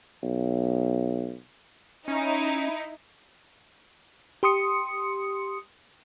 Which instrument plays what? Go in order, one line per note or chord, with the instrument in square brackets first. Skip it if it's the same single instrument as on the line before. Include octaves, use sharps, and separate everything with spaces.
[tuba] B1
[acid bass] C#4 [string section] D#4 E4
[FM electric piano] G4 C6 D#6 C#7